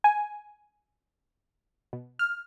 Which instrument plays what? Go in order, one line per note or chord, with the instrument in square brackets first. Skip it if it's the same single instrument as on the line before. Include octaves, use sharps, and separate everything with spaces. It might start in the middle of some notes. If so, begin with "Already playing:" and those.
[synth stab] G#5
B2
F6